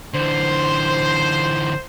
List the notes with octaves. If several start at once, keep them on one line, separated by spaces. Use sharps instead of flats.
D3 E3 C5